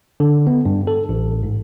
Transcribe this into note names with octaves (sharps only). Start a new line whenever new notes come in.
D3
B3
G2
A4
A1
G#2